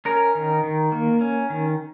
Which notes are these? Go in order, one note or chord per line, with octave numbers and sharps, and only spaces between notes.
C#4 A#4
D#3
D#3
A#3
C#4
D#3